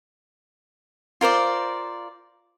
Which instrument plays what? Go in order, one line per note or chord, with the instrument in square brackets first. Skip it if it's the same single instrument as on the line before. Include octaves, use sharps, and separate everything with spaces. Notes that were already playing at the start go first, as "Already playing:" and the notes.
[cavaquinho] F4 A#4 C5 D5